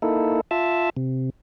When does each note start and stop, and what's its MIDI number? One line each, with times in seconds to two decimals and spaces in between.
0.02 0.41 58
0.02 0.41 63
0.02 0.41 64
0.02 0.41 69
0.51 0.90 65
0.51 0.90 76
0.51 0.90 81
0.97 1.30 48